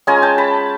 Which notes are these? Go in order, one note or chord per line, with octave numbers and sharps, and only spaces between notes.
G#3 C#4 F4 G#5 A#5
G5 A5
A5 B5